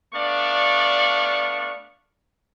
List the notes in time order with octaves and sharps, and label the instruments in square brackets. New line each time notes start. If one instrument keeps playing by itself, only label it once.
[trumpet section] A3 B3 D4 D5 F5 C#6